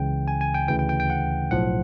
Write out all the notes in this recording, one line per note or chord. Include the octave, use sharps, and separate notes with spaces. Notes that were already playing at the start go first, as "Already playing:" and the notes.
Already playing: C#2 C#3 E3 G5
G#5
G#5
G5
D2 C#3 E3 G5
G5
G5
G5
F#5
B1 A2 F3 F#5